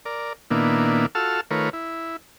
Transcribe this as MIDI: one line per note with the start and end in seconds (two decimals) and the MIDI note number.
0.05 0.33 70
0.05 0.33 74
0.51 1.06 46
0.51 1.06 51
0.51 1.06 58
0.51 1.06 59
0.51 1.06 62
0.51 1.06 64
1.15 1.41 65
1.15 1.41 66
1.15 1.41 69
1.15 1.41 81
1.15 1.41 88
1.15 1.41 89
1.51 1.70 51
1.51 1.70 57
1.51 1.70 65
1.51 1.70 70
1.51 1.70 71
1.51 1.70 73
1.73 2.16 64